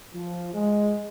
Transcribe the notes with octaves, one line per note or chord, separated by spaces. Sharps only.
F3
G#3